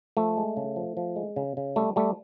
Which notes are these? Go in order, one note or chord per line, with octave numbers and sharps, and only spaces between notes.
F3 A3
G#3
C#3
F3
F3
G#3
C#3
C#3
G3 A3
G3 A3